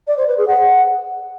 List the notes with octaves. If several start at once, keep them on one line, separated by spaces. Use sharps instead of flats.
D5
C5
B4
G#4
F#5